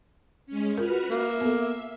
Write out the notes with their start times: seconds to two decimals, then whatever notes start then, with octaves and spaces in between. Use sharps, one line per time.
0.46 G#3 C#4
0.78 F4 F#4 A#4 B4 F6
1.11 A#3 E5
1.41 B3 A4